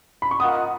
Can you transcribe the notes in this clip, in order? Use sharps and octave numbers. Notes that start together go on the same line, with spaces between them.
B5
C#6
F4 A#4 D#5 F#5 D#6